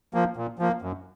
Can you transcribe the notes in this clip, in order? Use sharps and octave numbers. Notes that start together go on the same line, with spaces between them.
F3 A#3
A#2
F3 A#3
F#2